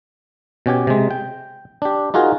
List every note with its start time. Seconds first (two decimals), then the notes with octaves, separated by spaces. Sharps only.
0.66 B2 C#4 G4 G#5
0.87 C3 G#3
1.11 G5
1.82 D4 G4
2.14 D#4 F4 F#4 G#4 A#4